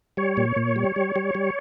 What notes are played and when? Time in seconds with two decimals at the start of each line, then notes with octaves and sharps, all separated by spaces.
0.17 G3 C#5
0.37 A#2
0.56 A#2
0.76 G3
0.96 G3
1.16 G3
1.35 G3